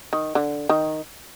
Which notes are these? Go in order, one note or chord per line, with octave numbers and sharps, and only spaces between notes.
D#3
D3
D#3